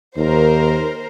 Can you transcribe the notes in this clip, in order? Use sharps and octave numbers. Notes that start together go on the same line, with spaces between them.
D#2 A#4 C5